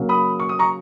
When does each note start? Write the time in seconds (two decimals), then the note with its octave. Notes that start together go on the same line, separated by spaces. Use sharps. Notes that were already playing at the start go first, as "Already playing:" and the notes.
Already playing: C#3 F#3 A#3
0.09 B5 D#6
0.40 C#6
0.49 D#6
0.59 A#5 C#6